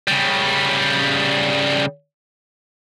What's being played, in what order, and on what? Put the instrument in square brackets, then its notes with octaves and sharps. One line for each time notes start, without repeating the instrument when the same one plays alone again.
[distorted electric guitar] C#3 G3